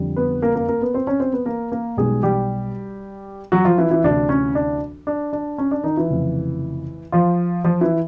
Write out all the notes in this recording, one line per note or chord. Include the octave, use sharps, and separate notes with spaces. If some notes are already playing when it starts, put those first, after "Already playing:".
Already playing: F2 D3 G3
B3 B4
A#3 A#4
A#3 A#4
A#3 A#4
B3 B4
C4 C5
C#4 C#5
C4 C5
B3 B4
A#3 A#4
A#3 A#4
B1 B2 G3 G#3 G#4
G3 G4
F#3 F#4
F3 F4
E3 E4
E3 E4
D2 C3 E3 D4
C#4
D4
D4
D4
C#4
D4
D#3 D#4
E3 E4
F1 F2 C#3
F3 F4
F3 F4
E3 E4